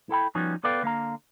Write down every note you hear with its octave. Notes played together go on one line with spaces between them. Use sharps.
E4 A4 G5 B5
F3 G3 B3 C#4 D#4 F#4
B3 A4 B4 D5 F5 G5
D3 A#3 F5 A#5